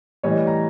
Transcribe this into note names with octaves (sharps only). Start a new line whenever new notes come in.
A2 E3 G3 C#5 D#5
A#5